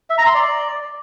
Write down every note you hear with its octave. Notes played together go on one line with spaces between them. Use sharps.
E5
A#5
C6
D5